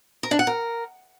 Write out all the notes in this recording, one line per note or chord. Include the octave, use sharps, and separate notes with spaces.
A#4
D4
F#5
A#4